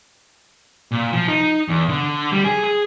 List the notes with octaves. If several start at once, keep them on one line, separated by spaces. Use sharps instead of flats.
A#2
F3
D#4
E2
D3
G3
G#4
G#4